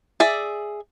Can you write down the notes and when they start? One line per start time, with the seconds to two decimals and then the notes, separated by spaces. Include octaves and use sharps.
0.20 G#4 D5 E5